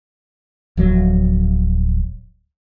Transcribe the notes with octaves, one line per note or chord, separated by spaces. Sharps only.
D1 F3 F#3